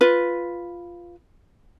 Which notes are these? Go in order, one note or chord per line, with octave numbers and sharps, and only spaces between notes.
F4 B4